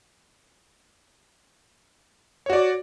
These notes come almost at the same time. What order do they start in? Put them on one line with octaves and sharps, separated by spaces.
C#5 F#4 D5